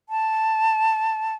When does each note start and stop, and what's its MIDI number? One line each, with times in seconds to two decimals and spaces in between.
0.09 1.35 81